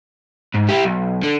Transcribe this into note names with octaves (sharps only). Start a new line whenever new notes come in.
G#2
E4 G4
B1
D3